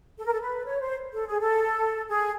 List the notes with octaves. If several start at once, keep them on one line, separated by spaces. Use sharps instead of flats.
A4
A#4
A4
B4
C#5
C5
A4
G#4
A4
G#4